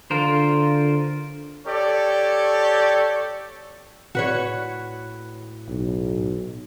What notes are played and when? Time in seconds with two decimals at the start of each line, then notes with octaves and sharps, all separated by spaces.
0.11 D3 F4 A#4 C5
1.67 G4 A4 C#5 D5
4.15 A2 F#4 B4 C#5
5.68 B1